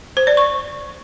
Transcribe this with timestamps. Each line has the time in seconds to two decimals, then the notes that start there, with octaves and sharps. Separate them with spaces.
0.17 C5
0.27 D5
0.37 C#6